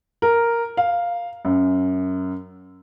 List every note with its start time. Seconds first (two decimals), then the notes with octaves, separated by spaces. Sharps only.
0.22 A#4
0.77 F5
1.45 F#2